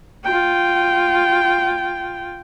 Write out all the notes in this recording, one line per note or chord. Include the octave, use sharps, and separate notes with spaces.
F4 G5